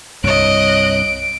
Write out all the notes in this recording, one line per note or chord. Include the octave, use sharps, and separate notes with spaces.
C2 G2 C#5 D#5 F#6 D7